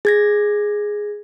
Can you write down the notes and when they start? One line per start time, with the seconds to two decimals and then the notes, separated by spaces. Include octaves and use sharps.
0.05 G#4 G#6 A#6